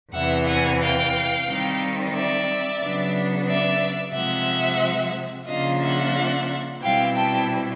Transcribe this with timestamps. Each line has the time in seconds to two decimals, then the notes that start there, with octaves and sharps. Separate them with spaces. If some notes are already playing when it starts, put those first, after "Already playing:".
0.13 E2 C3 E3 E5 F#5
0.47 F#5 G#5
0.80 F5 G5
1.47 D#3 G3 C4
2.14 D5 E5
2.82 C#3 F#3 B3 D4
3.47 D5 E5
4.14 C3 F3 G#3 E5 F#5
5.48 C#3 F3 A#3 D4 F4 D#5 F5
5.82 E5 F#5
6.81 B2 G3 C4 E4 F5 G5
7.15 G5 A5